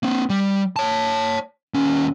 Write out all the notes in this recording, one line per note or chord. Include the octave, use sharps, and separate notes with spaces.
A#3 C4
G3
C#5 A5
D#2 C#4